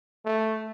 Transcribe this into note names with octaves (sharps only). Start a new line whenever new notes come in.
A3